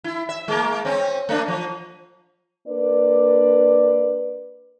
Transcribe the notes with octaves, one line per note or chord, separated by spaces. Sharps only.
E4
E5
G#3 A#3
C4 C#4
A3 D4
F3
A#3 D4 B4 D5